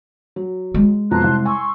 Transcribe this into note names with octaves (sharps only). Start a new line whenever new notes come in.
F#3
G#3
F2 B2 A5 A#5 C6 F#6
C2
G#5 C6 C#6 E6